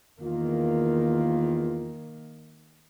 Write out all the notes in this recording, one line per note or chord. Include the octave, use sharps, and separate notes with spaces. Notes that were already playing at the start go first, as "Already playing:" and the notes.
E2 D#3 A#3 F4